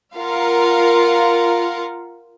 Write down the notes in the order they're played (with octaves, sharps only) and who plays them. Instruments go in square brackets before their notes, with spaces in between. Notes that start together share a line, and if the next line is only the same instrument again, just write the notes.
[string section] F4 A#4 F5 F#5